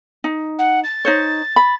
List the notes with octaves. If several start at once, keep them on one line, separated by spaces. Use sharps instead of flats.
D#4
F#5
A6
D#4 C5 C#5
B5